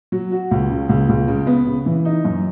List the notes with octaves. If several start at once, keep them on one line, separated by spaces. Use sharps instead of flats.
F#3
F#4
C#2
C#3
C#2
C#2
C#3
B3
C#3
E3
D#4
F#2